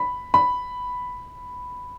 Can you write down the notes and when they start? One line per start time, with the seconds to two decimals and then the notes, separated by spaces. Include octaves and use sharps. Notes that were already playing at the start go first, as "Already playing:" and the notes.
Already playing: B5
0.34 B5